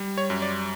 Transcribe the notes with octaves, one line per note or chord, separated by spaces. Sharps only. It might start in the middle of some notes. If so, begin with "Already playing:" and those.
Already playing: G3
C#5
F#2
D5